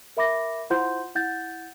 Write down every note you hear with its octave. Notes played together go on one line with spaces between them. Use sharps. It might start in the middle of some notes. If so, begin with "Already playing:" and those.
A#4 E5 B5 D6 A#6
E4 F4 C5 F#5 C6 G6
E4 F#5 G6 A6